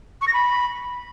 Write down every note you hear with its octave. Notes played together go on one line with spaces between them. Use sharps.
C#6
A#6
B5